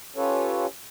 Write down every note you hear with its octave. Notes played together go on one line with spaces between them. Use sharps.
C#4 F4 G4 A4 B4 C#5